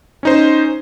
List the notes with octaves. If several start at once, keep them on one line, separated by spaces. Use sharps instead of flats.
C#4 D#4 C5